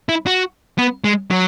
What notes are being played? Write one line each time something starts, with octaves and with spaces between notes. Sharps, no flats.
E4
F#4
B3
G#3
F#3